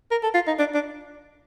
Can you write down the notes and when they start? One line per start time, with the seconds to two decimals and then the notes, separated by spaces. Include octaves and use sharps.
0.11 A#4
0.23 A4
0.34 F4
0.47 D#4
0.59 D4
0.74 D4